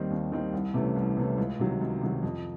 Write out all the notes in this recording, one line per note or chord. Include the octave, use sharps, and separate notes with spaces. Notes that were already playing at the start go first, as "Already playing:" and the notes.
Already playing: D#2 D#3 G3 C4 D#4
D#2
D#3 G3 C4 D#4
C2
C3 E3 A3 C#4
C2
C3 E3 A3 C#4
C#2
C3 D#3 F#3
C#2
C3 D#3 F#3
F2